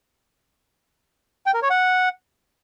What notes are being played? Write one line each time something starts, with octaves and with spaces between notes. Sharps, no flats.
G5
A#4
C#5
F#5